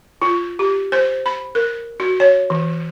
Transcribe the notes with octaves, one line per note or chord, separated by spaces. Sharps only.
F4
G4
C5
B5
A#4
F#4
C#5
E3